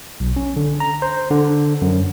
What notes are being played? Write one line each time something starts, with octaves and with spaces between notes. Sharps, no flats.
B1
C#4
D3
A#5
C5
D3
F#2